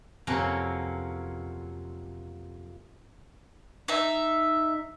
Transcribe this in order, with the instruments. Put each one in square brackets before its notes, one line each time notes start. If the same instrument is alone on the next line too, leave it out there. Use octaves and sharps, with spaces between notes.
[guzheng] F2 C3 F#3 A#3 C#4
[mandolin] D#4 E5